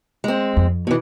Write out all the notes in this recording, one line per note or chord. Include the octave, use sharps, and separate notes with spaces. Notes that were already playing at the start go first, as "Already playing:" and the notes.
G#3 C4
F2
B2 E3